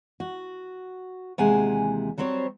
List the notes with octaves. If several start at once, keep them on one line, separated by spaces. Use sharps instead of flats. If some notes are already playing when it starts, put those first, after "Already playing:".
F#4
D#2 C3 E3 G#3 F#5 G#5
F#3 G3 C4 C5 C#5